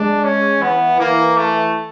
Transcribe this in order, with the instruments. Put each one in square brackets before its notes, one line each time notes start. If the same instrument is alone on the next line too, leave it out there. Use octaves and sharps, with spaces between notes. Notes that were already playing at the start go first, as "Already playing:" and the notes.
Already playing: [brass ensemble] G#3 [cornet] D4
[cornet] C#4
[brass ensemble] E3 [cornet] B3
[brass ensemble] E3 [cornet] A#3
[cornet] A3